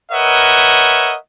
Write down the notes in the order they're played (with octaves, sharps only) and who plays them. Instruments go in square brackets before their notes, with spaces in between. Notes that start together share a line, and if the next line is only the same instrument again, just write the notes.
[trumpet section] A#4 B4 C#5 D#5 E5 F#5